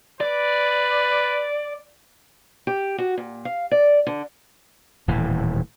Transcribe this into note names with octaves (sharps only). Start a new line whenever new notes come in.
B4 D5
G4
F#4
A#2
F5
D5
D3
D#1 A2 E3